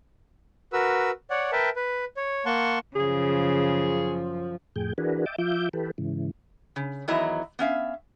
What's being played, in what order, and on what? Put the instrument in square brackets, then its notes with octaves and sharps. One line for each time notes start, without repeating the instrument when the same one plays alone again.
[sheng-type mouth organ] F#4 A#4 B4 E6
C#5 D5 F#5
A#4 B4 E5 G5 A5
B4
C#5
A#3 F#5 A5 C6 C#6
[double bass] F#2 F3 [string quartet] C#3 [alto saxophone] G#4
[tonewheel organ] F2 A2 G#4 G5
E3 D4 F#4 G#4 A#4 B4
D#5 E5 G5 A5 D6
F3 F4 E5 D6 G6
E3 G4 A4 B4
G#2 C#3 E3
[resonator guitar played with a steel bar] C#3
E2 D#3 F#3 E4 D#5 A#5
B3 C#4 E5 F5